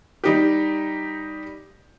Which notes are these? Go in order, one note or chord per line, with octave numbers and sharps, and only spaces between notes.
G3 D#4 G4